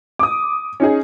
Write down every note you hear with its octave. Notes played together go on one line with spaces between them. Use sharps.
D6 D#6
C#4 D#4 G#4